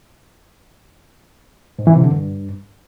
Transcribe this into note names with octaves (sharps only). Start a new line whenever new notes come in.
G#2
E3
C3
D3
G2